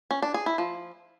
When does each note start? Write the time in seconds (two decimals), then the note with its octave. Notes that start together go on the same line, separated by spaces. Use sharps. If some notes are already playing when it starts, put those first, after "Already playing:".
0.11 C#4
0.22 D4
0.34 G#4
0.46 E4
0.58 F3